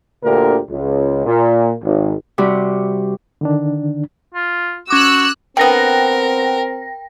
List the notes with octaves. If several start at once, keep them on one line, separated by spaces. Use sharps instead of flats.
D2 A#2 D3 A#3 G4 A#4
C#2
A#2
G#1
C3 G3 F#4
D3 D#3 D4
F4
C#4 F#4 D6 E6 F#6
D3 B3 C4 A#4 G5 A#6